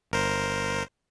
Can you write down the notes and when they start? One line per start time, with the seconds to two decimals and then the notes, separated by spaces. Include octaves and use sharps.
0.11 G1 A#4 C5